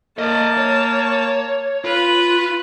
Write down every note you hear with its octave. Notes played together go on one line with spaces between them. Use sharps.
A#3 D5 D#5 A5
C#5
F4 B4